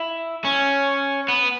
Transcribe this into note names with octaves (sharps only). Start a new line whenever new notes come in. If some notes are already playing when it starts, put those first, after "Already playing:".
Already playing: E4
C#4
B3